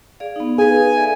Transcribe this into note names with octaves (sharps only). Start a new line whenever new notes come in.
G#4 D5 F5
B3 D#4
G#4 B4 F5 G#5
A4 D5 E5